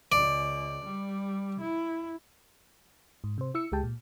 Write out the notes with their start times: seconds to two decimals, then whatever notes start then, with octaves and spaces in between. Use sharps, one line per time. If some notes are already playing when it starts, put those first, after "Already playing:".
0.12 C#2 D5
0.85 G3
1.60 E4
3.24 G#2
3.38 C3 C5
3.55 E4 E6 C#7
3.72 C#2 G#3 G4 G5 A5
3.84 A#2